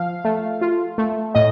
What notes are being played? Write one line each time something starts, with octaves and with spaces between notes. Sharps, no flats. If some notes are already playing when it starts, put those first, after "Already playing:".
Already playing: F3 F5
A3
F4
A3
A2 D#5